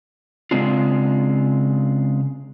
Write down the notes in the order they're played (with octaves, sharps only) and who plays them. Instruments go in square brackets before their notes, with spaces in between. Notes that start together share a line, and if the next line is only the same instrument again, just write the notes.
[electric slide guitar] C#3 G#3 C4 D4 F4